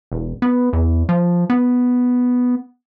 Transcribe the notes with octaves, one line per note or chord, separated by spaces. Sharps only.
E1
B3
E2
F3
B3